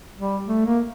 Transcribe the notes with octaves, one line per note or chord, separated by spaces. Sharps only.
G3
A3
A#3